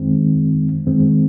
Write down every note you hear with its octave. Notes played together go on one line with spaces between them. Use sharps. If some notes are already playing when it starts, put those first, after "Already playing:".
Already playing: F#2 D#3 G#3 C4
F#2 D#3 G#3 C4